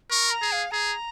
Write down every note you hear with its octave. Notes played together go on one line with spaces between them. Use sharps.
A#4 C#6
A#5
G#4
F5
G#4 A#5